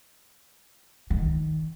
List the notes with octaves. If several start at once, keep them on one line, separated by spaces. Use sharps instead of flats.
D#3